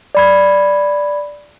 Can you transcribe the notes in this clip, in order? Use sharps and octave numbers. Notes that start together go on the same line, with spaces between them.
D5 B5 G#6